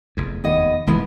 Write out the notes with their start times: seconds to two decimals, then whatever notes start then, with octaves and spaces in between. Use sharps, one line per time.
0.17 F1 E2
0.44 D#2 B3 D#5
0.87 D#1 C#2 G#2 E3 G#3 B3